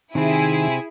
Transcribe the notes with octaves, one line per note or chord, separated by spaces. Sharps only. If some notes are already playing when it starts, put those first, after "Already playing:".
C3 D#3 C4 E4 G#4